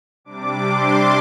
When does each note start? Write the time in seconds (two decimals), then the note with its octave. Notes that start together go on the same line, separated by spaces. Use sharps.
0.25 C3 G3 D4 D6
0.64 C6